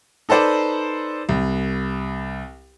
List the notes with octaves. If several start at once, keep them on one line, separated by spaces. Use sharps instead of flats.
D#4 A4 B4 C5 D5
C2